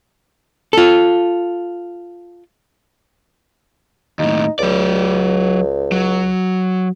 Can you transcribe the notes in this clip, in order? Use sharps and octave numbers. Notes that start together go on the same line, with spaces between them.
F4 A4
D#2 A2 D#4
C#2 F#3 D5
F#3